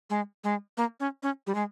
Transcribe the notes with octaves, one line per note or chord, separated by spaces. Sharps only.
G#3
G#3
A#3
C#4
C#4
G3
G#3